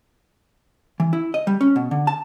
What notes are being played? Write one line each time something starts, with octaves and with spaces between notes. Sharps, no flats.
E3
E4
D#5
G3
C#4
B2
D3
A5